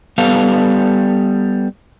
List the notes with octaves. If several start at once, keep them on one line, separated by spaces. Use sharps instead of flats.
G3 B3 A4 F5